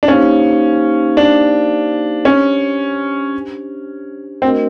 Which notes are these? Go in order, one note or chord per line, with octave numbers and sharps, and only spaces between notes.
D4
A#3 C#4 D#4 G4 C5 F5
D4
C#4 D4 G4 C5
A3 C4 D4 F#4 A#4 D#5